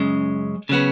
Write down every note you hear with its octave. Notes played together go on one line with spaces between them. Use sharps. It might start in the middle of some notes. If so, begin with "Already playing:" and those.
Already playing: F#2 C#3 G#3
C#3 F#3 B3